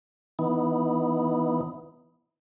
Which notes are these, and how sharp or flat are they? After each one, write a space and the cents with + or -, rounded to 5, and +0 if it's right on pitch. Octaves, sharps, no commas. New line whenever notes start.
E3 -5 B3 -5 D#4 +0